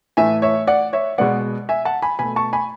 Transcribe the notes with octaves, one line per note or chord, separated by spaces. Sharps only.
A2 E3 A3 E5 G#5
C#5 E5
D5 F#5
C#5 E5
B2 G#3 B3 D5 F#5
E5 G#5
F#5 A5
G#5 B5
B2 A3 G#5 B5
A5 C#6
G#5 B5